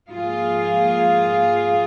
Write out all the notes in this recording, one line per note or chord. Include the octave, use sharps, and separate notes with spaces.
G#2 F3 A#3 F4 G#4